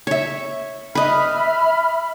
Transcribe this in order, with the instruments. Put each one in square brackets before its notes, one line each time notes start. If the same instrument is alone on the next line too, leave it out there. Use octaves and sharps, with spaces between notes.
[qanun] C#5 E5
[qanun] B4 D#5 [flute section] E5 B5 F6